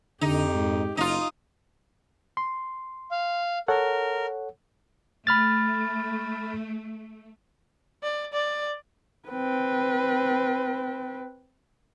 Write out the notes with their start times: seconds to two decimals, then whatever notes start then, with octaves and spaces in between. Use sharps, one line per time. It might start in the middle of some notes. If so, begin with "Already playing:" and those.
0.21 F2 D3 D#4 G4
0.55 G#2
0.97 F#1 D#4 F4 D#6
2.37 C6
3.11 F5
3.68 A4 A#4 C#5 F#5
5.27 A3 B5 F6 A6
8.03 D5
8.33 D5
9.29 C4 B4